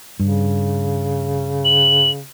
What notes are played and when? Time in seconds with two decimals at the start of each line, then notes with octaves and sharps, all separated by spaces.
0.20 G2 C#3
1.65 F#7